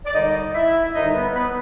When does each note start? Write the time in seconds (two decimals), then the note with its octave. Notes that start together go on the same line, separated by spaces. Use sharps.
0.05 D5
0.13 D#2 D3 G3 D#4 D#5
0.54 E4 E5
0.94 D#2 D3 G3 D#4 D#5
1.14 B3 B4
1.34 B3 B4